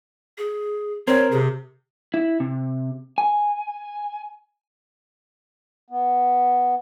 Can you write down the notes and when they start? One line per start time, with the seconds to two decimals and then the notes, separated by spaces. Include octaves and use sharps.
0.38 G#4
1.08 C4 A#4 C#5
1.32 C3 G#4
2.14 E4
2.40 C3
3.18 G#5
5.90 B3